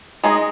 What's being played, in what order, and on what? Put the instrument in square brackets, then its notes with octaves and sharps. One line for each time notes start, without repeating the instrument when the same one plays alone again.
[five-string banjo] G#3 D#4 G#4 D#5